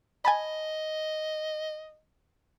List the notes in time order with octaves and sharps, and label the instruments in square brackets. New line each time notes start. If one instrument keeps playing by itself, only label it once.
[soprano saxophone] D#5 [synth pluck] G#5 A5 B5